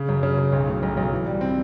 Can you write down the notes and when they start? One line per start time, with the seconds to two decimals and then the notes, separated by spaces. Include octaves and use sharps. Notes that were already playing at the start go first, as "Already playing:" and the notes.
Already playing: C#3
0.09 F#2
0.23 C#3
0.38 C#3
0.52 B1
0.67 A2
0.83 B1
0.97 B1
1.12 E3
1.26 G3
1.41 C4